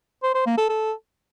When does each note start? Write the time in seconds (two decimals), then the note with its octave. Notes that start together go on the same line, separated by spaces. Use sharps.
0.23 C5
0.34 C5
0.46 A#3
0.58 A4
0.69 A4